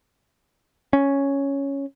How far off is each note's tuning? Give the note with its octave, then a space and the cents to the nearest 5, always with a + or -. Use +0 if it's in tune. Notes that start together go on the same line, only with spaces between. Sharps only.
C#4 +0